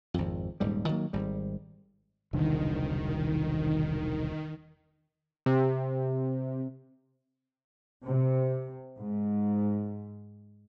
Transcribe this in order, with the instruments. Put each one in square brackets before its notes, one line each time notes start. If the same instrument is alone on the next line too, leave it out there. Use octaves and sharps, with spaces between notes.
[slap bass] G#1 F2
D#1 G#2 G3
D#3 F#3 A#3
G#1 G3
[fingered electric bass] E1 C2 D3 [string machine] D#3
[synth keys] C3
[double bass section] C3
G#2